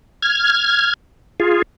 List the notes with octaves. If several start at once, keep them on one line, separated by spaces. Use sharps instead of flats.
F6 G#6
F4 G#4